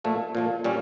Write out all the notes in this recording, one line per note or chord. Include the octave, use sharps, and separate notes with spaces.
A#2 F3 A3
A#2 F3 A3
A#2 G3 C#4